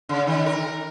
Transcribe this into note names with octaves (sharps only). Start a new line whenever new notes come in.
C#3
D#3
A#4